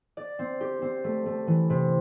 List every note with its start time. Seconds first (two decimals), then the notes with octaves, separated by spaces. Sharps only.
0.17 D5
0.39 C4
0.61 G4
0.82 C4
1.04 A3
1.26 A3
1.47 E3
1.70 C3